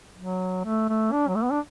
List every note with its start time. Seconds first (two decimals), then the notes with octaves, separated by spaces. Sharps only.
0.18 F#3
0.65 A3
0.89 A3
1.12 D4
1.28 F#3
1.36 A3
1.44 B3
1.52 D4